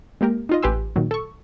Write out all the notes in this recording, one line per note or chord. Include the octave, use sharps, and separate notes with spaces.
G#3 A#3 G4 A#4
D#4 F4 D#5
A1 G4 B4 G#5 C6 E6
A#2 D#3 F#3
A4 C#6